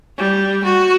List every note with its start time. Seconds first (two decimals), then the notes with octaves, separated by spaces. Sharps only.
0.17 G3
0.64 F#4